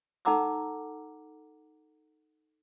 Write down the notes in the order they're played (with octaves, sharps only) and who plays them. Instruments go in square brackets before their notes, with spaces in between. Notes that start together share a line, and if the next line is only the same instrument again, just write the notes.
[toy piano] D#4 A4 F#5 A#5 D6 E6